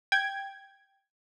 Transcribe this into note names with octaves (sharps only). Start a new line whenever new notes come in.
G5 G#6